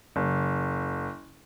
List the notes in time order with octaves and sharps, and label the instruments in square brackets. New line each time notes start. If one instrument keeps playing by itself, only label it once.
[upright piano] F#1